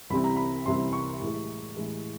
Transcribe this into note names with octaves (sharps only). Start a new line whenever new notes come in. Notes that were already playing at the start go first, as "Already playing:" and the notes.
C2 C3 E3 G3 C4 B5
A#5
B5
C2 C3 E3 G3 C4 C6
C#6
A2 E3 G#3
A2 E3 G#3